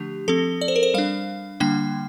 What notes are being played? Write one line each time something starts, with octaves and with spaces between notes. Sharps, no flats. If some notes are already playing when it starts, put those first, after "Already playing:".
Already playing: D3 F3 A3 D4 G4
F3 C4 A4
D5
C5
A#4
C5
G3 D4 F5
D3 G3 A#3 D4 G5